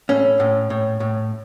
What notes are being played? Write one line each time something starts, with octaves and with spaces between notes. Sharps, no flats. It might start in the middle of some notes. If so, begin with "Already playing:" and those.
A2 C#4
A2
A2
A2